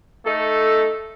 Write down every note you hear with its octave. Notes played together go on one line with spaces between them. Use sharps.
A3 D#4 A4